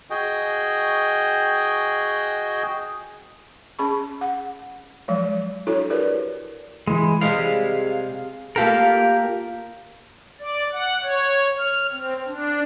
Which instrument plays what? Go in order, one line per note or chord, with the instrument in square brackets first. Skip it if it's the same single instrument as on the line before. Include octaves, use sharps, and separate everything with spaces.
[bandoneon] F#4 G#4 D#5 G5
[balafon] C#4 G#4 B5 C#6
F#5
F3 F#3 G#3
D4 E4 F#4 A4 C#5
G4 A#4 B4 D5
[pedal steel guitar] E3 G#3
[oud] C3 G3 G#3 [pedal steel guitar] F5
[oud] A#3 F4 A4 [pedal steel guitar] G4 A#4
[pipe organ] D5
F#5
C#5
F6
C4
D4